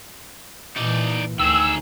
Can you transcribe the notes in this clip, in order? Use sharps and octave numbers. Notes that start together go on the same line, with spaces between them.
A#2 E3 D#4 D5
D2 D#3 G#4 E6